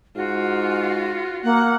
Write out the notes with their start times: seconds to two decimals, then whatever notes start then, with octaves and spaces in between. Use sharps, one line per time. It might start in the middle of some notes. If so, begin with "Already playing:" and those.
0.16 G#2 F4 F#4
1.44 A#3 F#5